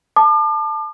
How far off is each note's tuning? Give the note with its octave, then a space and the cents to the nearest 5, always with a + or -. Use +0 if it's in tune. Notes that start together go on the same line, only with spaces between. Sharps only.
A5 +0 D6 +40